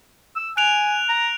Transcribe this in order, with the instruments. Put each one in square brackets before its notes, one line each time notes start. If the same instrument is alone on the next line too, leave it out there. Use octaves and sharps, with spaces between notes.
[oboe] E6
[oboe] G#5 [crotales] F#6 D7 F7
[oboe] A#5